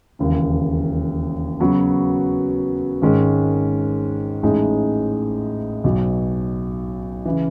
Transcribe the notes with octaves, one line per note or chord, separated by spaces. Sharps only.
E1 D#2 C#3
C#3 F#3 B3 F#4
G#1 G#2 D#3 G#3 C#4
A1 A2 G#3 D#4 G#4
B1 B2 F#3
C#3 E3